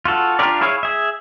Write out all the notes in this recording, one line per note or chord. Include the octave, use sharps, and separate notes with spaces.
F4 F#4 A4
D4 F4 G4 A#4 D5
E4 G#4 C#5 F5
G#4 E5